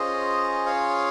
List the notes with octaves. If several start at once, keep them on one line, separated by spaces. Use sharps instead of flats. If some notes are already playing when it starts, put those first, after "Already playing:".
Already playing: C#4 F4 G#4 C5 D#5
C#5 F5